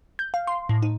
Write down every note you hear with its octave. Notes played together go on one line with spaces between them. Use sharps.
G6
F5
C6
A2
D#4